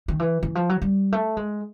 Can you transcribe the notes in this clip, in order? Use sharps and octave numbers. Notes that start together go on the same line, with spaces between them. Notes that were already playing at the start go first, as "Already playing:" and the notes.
D#3
E3
E3
F3
F#3
G3
A3
G#3